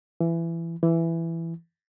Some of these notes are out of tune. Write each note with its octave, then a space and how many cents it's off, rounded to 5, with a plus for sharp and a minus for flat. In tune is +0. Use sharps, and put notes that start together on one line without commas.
E3 +20
E3 +10